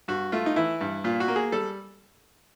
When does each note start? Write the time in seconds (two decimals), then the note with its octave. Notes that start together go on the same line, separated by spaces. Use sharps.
0.08 G2 F#4
0.32 A3 F4
0.46 D#4
0.56 E3 E4
0.81 G2
1.04 A#2 F4
1.20 F#4
1.28 A#3
1.36 G#4
1.52 G3 A4